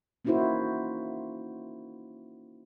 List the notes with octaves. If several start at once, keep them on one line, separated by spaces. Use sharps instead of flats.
A#3 C#4 D#4 E4 F#4 C5